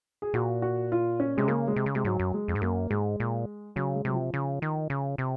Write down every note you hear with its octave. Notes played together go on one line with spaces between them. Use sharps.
G#4
A#2 F#4
F#4
F4
C#4
C3 G#3
C#3 A#3
G#3
C3
C#3
C3 G#3
G#2 F#3
F#2
G#3
F2
G#2
F#2 A#3
G#2 G#3
A#2
C#3 F#3
G#3
C3 F#3
F3
C#3
D#3
C#3
C3